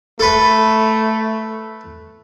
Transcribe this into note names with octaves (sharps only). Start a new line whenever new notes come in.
A3 A4 B4